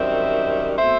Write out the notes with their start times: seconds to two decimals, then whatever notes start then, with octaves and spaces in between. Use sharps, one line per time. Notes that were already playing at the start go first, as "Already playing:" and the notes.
Already playing: F#2 D#3 G3 C4 C5 E5
0.77 B2 A3 C4 C5 E5